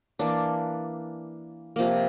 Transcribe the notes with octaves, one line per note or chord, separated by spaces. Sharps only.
E3 A#3 D4
C3 F3 A#3